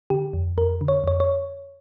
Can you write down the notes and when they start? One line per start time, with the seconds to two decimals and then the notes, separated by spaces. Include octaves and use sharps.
0.10 D3 G4
0.33 F2
0.58 F2 A#4
0.81 D3
0.88 C#5
1.04 F2 C#5
1.20 C#5